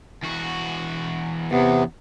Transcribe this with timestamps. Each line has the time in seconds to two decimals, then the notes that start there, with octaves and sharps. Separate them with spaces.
0.23 E2 F#4
1.52 E2 C3 B3